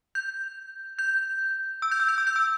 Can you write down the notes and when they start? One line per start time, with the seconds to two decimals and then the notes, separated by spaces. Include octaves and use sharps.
0.15 G6
0.99 G6
1.82 E6
1.91 G6
2.00 E6
2.08 G6
2.18 E6
2.27 G6
2.36 E6